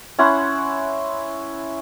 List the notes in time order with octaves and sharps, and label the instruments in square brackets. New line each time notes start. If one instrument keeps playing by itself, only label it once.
[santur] C#4 E4 F#5 C6